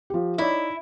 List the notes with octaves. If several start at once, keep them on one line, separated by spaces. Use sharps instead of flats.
F3 G4
D#4 E4 C#5 D5